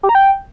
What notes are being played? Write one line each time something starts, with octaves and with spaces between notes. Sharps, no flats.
G4
A#5
G5